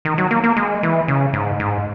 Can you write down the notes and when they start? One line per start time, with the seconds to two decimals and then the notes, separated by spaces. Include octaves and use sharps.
0.05 D#3
0.18 F#3
0.31 A#3
0.44 A#3
0.57 G#3
0.83 E3
1.08 C#3
1.34 G#2
1.60 G#2